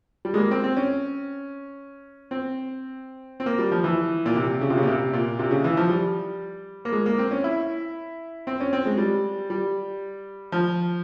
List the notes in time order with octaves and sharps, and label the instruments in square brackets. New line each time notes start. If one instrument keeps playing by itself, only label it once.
[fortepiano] G3
G#3
A#3
C4
C4
C#4
C4
C4
A#3
G3
F3
E3
A#2
C3
C#3
C3
C#3
A#2
C3
A#2
C3
C#3
E3
F3
G3
A#3
G#3
A#3
C4
C#4
E4
C4
C#4
C4
G#3
G3
G3
F3